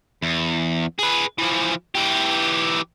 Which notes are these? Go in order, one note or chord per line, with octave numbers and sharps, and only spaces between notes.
E2
G#4 B4
E3 F3
E3 G4